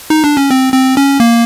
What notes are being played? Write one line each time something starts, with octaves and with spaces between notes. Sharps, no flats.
D#4
D4
C#4
C4
C4
C#4
A#3